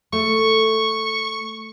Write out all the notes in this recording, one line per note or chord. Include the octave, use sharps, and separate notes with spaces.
A3 C#6